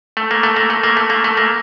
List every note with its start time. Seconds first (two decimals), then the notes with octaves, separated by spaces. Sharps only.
0.17 A3
0.31 A#3
0.43 A3
0.56 A#3
0.70 A3
0.84 A#3
0.97 A3
1.10 A#3
1.24 A3
1.37 A#3